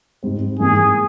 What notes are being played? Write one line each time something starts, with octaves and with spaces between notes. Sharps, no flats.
G#2 G3 C4
G#2 E3 G3 A#3 G#4